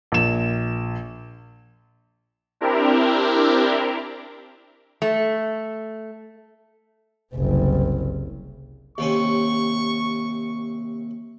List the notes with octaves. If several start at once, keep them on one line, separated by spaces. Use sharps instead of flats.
A#1 E7
C4 D4 E4 G4 A#4
A3
F#1 C2
D#2 C3 C#4 C#6